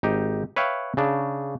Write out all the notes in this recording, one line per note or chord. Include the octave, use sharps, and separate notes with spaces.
G#1 D#4 G4
B4 C#5 E5 F5 G5
C#3 D4